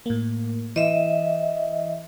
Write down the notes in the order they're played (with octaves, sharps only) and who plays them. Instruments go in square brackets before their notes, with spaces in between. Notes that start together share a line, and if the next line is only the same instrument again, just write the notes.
[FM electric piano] A2 A#3
[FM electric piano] E3 [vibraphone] D#5 E5